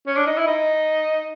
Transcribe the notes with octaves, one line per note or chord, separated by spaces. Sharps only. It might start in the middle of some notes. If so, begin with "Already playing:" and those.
C#4
D4
D#4
E4
D#4